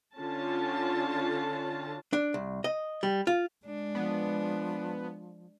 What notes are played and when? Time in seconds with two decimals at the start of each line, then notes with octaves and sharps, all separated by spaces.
0.16 D3 C#4 F4 A5
2.13 D4
2.34 C2
2.64 D#5
3.03 G3
3.27 F4
3.66 G#3 D4
3.95 F3 B3